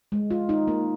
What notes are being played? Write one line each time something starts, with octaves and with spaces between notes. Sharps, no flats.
G#3
F4
D#4
A#3